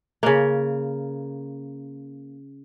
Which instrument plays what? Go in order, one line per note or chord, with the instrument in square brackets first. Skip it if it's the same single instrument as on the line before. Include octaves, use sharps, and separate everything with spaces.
[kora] C#3 A#3